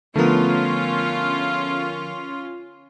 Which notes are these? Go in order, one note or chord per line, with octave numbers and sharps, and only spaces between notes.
D3 F3 A3 B3 C#4 F4 A#4